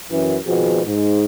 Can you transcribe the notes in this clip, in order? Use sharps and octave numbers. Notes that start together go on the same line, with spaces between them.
F#2 E3
G#1 B2 F3 C4 F#4 G#4
G#2